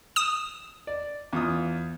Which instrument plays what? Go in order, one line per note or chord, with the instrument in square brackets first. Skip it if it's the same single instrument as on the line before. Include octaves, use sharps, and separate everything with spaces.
[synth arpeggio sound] D#6 E7
[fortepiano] D5
E2 F4 D#6